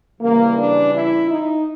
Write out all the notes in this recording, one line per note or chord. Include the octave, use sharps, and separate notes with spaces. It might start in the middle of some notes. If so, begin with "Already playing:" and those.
C#3 E3 G3 A#3
D4
E4
D#4